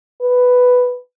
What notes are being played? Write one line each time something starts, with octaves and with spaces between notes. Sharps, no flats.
B4